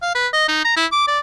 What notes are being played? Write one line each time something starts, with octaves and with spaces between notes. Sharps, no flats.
F5
B4
D#5
D#4
A#5
E4
D6
D5